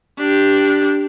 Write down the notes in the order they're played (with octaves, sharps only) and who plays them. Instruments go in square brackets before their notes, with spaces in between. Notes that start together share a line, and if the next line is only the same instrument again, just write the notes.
[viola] D4 G4